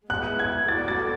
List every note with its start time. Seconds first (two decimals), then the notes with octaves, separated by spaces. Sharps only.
0.09 G#3 B3 E4 F#6
0.39 G#6
0.68 B3 F#4 A4 D5 A6
0.88 A6